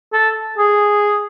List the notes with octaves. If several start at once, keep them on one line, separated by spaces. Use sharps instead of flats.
A4
G#4